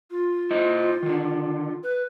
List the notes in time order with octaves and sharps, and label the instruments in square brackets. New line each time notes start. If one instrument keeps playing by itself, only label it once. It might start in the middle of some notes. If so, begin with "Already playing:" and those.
[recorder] F4
[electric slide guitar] E4 C5 D#5
D3 D#3
[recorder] B4